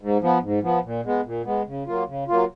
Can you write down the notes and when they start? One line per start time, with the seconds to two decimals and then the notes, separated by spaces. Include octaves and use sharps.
0.01 G#2
0.22 F3 B3
0.43 G#2
0.63 F3 B3
0.84 A#2
1.05 G#3 B3
1.26 A#2
1.45 G#3 B3
1.67 C#3
1.87 F#3 A#3 F4
2.08 C#3
2.28 F#3 A#3 F4